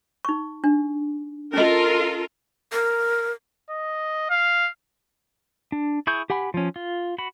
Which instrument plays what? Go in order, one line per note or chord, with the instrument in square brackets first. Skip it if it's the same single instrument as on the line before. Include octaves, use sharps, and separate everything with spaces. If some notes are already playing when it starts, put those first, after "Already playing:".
[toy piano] D#4 C#6
D4
[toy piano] C#4 D#5 [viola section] F4 A4 A#4
[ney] A#4
[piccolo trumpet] D#5
F5
[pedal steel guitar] D4
E4 G#4 C#6 G6
G4 F#5 G#5 B5
F3 C#4
F4
F#4 B5